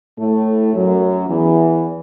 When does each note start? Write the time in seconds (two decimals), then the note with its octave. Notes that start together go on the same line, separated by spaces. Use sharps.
0.19 A2 A3
0.74 F#2 F#3
1.28 E2 E3